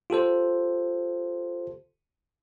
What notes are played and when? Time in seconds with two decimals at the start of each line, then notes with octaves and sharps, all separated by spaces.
0.10 F4 G4 A4 C5